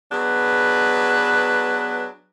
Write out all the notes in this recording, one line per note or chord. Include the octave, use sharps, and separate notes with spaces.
F#3 B3 D4 G#4 B4